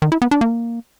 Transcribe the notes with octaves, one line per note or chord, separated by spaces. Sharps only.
D#3
E4
B3
D4
A#3